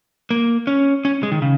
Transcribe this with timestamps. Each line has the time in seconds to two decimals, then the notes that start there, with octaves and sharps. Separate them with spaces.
0.31 A#3
0.67 C#4
1.05 C#4
1.23 G#3
1.32 D#3
1.42 C#3